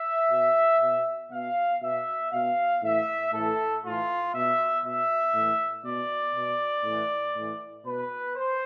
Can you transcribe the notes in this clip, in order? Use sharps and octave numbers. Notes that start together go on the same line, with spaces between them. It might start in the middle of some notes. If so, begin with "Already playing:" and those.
Already playing: E5
B2
B2
B2 F5
B2 E5
B2 F5
A2 E3 E5
A2 E3 A4
A2 E3 F4
B2 E5
B2 E5
A2 E3
B2 D5
B2
A2 E3
A2 E3
B2 B4
C5